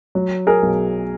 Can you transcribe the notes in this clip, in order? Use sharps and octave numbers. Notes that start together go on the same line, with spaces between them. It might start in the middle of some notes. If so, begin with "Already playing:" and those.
F#3
G#4 A#4
B1